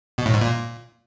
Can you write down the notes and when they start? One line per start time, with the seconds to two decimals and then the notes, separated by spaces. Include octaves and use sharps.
0.18 B2
0.26 A2
0.34 G#2
0.41 A#2